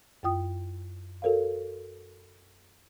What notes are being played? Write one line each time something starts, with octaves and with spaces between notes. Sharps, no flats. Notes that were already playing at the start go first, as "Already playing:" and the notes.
F#2 F4 G5 D#6
F#4 A4 A#4 C#5 F5